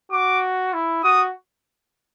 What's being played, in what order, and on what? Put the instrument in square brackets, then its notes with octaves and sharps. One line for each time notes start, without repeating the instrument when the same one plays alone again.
[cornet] F#4 [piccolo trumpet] D6
[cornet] E4
[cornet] F#4 [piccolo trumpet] D#6